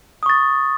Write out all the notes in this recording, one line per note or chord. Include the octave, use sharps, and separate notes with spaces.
C#6 D#6 A6